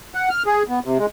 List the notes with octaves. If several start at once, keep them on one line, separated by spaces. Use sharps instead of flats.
F#5
F6
G#4
B3
C3
G#3